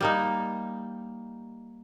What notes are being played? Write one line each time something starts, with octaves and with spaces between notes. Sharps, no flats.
G3 A#3 D#4